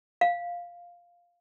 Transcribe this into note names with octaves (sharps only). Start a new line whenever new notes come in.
F5